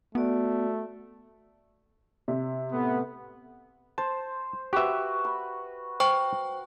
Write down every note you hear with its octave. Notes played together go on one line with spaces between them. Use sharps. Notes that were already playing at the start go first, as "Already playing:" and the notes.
A3 B3 F#4 D5
C3
A2 A3 B3
C5 A5
F#4 G4 B4 E5
B5
C5 G5 C#6